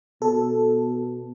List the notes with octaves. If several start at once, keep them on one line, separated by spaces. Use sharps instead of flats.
B2 A4